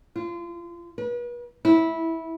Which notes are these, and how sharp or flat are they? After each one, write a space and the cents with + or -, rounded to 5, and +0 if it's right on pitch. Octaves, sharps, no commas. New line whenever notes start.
F4 -30
B4 -40
E4 -15